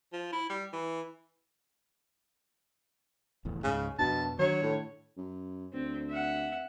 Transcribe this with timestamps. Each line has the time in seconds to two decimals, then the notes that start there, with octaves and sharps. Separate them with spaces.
0.13 F3
0.32 E4
0.50 G3
0.73 E3
3.45 F1 E2 A2
3.64 C#2 G#2 C#3
3.99 F2 B2 D4 A5
4.39 D#3 F#3 D4 C#5
4.63 A2
5.17 F#2
5.73 D2 C4
6.10 E5 F#5